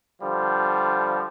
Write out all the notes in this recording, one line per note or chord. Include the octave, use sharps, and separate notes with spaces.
D3 F3 G3